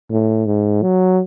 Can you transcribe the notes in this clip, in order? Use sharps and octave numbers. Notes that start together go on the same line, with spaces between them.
A2
G#2
F#3